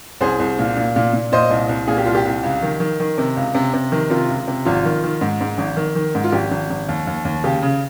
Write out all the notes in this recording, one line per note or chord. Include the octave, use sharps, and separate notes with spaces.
C2 G#4 C5
C2
A#2
A#2
A#2
A#2
A#2 C5 D#5
C2
C2
A#2 G#4
G4
C2 F4
G4
C2
C#2
D#3
D#3
D#3
C3
C#2
C3
C3
D#3
C3 F4
C#2
C3
G#1 F4
D#3
D#3
G#2
G#2
G#1
D#3
D#3
G#2
F4
G#1 G4
G#1
G#1
D#2
D#2
D#2
C#3 G4
C#3